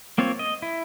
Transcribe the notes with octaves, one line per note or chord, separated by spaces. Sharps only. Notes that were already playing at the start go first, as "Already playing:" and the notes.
A#3 C4 F4 C#5
D#5
E4